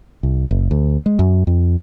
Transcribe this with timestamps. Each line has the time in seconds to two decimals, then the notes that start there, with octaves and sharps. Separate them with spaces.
0.23 C2
0.51 F#1
0.71 D2
1.06 G#3
1.19 F#2
1.47 F2